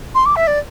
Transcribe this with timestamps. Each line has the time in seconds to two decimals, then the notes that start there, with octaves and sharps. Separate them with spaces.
0.15 C6
0.25 D6
0.36 E5
0.47 D5